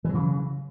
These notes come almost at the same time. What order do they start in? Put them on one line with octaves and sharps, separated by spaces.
E3 F#3 C#3